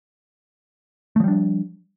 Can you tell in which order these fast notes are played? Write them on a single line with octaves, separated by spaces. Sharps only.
A3 F3 G3 D4